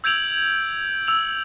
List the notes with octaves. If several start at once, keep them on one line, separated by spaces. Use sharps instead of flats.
E6 G6 G#6 D7 F7 F#7
E6 F7